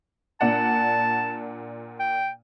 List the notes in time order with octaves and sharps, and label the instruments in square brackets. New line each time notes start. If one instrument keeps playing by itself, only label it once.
[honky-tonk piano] A#2 D4 F#5 [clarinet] A5
[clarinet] G5